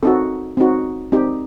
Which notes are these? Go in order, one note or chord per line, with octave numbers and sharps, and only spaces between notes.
C4 D#4 F#4 A4
C4 D#4 F#4
C4 D#4 G4